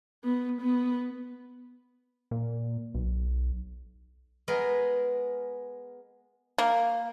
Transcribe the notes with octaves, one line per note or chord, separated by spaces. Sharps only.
B3
B3
A#2
B1
G#3 B3 A#4
A#3